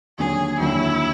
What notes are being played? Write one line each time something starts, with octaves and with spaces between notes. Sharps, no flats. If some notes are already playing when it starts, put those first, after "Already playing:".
D#2 D3 F#3 G#4
D#2 D3 F#3 E4